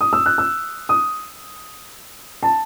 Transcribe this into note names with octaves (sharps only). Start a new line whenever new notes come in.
D#6
E6
F#6
E6
D#6
A5